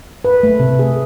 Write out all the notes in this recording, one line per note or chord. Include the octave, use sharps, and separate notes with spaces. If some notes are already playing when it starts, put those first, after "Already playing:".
B4
A3
C3
G#4